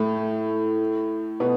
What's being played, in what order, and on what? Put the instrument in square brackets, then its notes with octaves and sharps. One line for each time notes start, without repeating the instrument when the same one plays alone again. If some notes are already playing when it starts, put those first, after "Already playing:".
Already playing: [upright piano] A2 A3
B2 B3